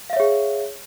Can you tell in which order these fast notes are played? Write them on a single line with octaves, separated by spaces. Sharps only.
F5 E5 C#5 G#4